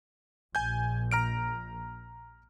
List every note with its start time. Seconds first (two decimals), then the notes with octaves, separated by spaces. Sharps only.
0.55 A#1 G#5 G6
1.11 A#5 F6 D7